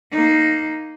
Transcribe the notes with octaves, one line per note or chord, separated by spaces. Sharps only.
A#3 D#4